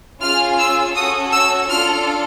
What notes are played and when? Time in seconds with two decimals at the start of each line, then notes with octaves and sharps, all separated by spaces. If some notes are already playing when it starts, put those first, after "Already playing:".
0.21 C#4 F4 G#4 F6
0.59 E6
0.95 C#4 F#4 A4 D#6
1.32 E6
1.70 D4 F4 A4 F6